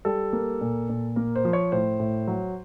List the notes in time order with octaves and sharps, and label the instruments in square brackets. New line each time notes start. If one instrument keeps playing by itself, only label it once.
[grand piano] G3 A4
A#3
A#2
A#2
A#3 A#4
C5
F3
C#5
A2 C5
A2
F#3